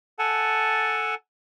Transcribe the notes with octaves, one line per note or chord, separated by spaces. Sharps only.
A4 F#5 G#5 A5